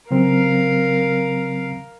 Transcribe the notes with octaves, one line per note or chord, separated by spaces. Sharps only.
C#3 F#3 C4 A#4 F5